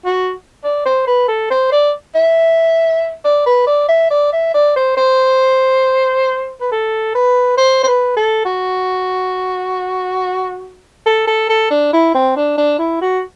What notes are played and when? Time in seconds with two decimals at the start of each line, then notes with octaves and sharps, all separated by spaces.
0.05 F#4
0.64 D5
0.85 C5
1.07 B4
1.28 A4
1.50 C5
1.72 D5
2.15 E5
3.24 D5
3.46 B4
3.67 D5
3.88 E5
4.11 D5
4.32 E5
4.54 D5
4.76 C5
4.97 C5
6.61 B4
6.72 A4
7.15 B4
7.58 C5
7.83 C5
7.87 B4
8.16 A4
8.45 F#4
11.06 A4
11.27 A4
11.49 A4
11.70 D4
11.93 E4
12.15 C4
12.36 D4
12.58 D4
12.79 E4
13.01 F#4